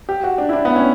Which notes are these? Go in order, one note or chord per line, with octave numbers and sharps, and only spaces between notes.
G4
F#4
D4
E4
D4
B3
C#4